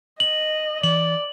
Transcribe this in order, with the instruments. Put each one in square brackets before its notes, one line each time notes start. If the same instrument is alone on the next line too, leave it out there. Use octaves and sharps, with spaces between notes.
[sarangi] D#5 [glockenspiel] F#7
[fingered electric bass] E3 [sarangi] D5 [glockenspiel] F#7